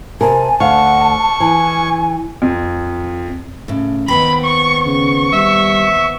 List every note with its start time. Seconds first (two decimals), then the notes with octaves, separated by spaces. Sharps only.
0.21 C3 A#4 G#5 A5
0.60 D2 F5 F#5 C#6
1.40 E3 G#5
2.42 F2
3.68 A2 C#3
4.08 D#2 B3 C4 B5
4.45 C#6
4.86 C#3 C#6
5.33 G3 E5